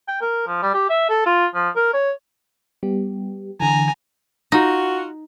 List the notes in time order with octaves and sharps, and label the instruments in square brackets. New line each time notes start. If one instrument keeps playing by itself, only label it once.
[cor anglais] G5
A#4
F3
G3
G4
E5
A4
F4
F3
A#4
C#5
[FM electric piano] G3 B3 G4
[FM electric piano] D3 E3 [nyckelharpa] G#5 A#5
[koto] D#4 [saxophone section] F4 F#4